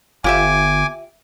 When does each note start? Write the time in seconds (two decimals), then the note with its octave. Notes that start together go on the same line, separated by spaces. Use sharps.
0.24 G1 F4 G4 E5 G#5 D6